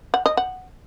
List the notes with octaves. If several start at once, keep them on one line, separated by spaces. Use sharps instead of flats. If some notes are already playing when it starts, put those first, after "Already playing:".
F#5
D#5
F#5